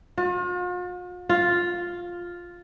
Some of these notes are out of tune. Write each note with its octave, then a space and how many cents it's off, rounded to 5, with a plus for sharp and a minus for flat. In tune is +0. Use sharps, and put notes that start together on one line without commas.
F4 +45
F4 +5